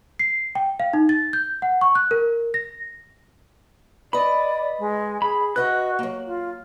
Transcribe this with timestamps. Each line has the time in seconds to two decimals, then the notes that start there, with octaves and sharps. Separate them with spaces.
0.19 C7
0.55 G5
0.80 F5
0.93 D#4
1.09 A6
1.33 G6
1.62 F#5
1.81 C#6
1.95 F#6
2.11 A#4
2.54 A#6
4.13 B4 D5 D#5 B5
4.79 G#3
5.22 G#4 B5
5.56 F#4 B4 D#5 E5 F#6
5.99 F#3 A#3
6.27 F4